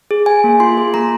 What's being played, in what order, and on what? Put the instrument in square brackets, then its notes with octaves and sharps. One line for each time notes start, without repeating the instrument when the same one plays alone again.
[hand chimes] G#4
G#4 G#5
A#3
F4 C6
G#4
A#3 A#5